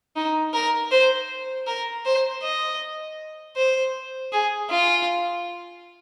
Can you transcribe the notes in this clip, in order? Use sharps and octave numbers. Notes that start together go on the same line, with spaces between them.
D#4
A#4
C5
A#4
C5
D#5
C5
G#4
F4